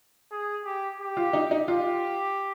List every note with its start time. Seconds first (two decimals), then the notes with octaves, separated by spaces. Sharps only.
0.32 G#4
0.65 G4
1.00 G4
1.17 F4
1.33 D#4
1.51 D#4
1.68 F4 G4